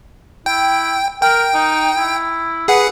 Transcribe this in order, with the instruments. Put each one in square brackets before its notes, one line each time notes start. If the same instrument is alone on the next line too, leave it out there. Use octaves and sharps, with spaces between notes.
[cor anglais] E4 [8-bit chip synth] G5
[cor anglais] A#4 [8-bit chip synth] G5
[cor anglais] D#4
E4
[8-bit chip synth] G#4 F#5 [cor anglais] B4